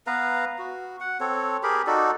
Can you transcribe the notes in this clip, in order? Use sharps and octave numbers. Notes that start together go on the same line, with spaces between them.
B3 B4 F5 A#5
F#4
F#5
C4 A4 C#5
G4 G#4 A#4 B5
D#4 F#4 A4 D5